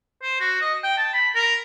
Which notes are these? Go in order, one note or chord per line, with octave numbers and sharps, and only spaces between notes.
C5
F#4
D#5
G5
A5
B5
A#4